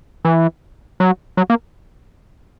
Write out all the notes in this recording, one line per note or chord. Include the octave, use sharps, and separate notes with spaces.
E3
F#3
F#3
A#3